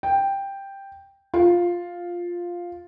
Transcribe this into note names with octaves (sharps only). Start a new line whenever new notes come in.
G5
F4